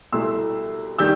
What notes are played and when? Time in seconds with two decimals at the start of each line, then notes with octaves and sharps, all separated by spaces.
0.12 C2 B2 A3 E4 C6 E6
0.98 D#3 G3 E6 G6